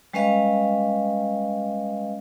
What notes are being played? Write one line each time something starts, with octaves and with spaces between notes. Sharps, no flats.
G3 G#3 C#4 B4 D#5 F5